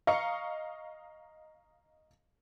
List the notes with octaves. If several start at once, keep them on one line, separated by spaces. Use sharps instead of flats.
D#5 F5 A#5 C#6 C#7